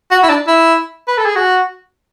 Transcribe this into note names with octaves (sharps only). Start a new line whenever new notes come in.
F#4
E4
D4
E4
B4
A4
G#4
F#4